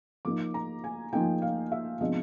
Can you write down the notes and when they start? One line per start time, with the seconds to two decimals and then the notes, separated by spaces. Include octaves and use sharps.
0.25 F3 A#3 D#4 D6
0.54 A#5
0.84 G#5
1.13 F3 A#3 D#4 G5
1.42 F5
1.72 E5
2.01 C3 F3 G#3 B3 D4 D#5